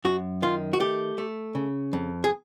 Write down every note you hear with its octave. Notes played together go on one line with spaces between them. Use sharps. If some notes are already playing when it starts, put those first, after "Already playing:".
F#2 F#4
D#3 F4
F#4
A3 G4
A3
C#3
F2
G#4